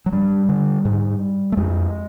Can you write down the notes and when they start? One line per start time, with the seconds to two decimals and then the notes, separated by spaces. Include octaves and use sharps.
0.06 F#3
0.12 G2 G3
0.49 D3
0.85 G#2
1.52 A3
1.57 F2 G#3